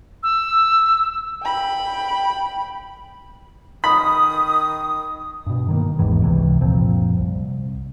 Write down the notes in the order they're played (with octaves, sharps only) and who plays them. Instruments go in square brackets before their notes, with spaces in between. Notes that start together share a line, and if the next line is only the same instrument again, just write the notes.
[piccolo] E6
[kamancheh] G5 B5
[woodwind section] D#3 D#6 [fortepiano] B5
[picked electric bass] G2 B2
D#3 E3 A#3
G#1 E2 G#2 E3
C#2 C3 E3
F#1 A#2 F3 C4
C2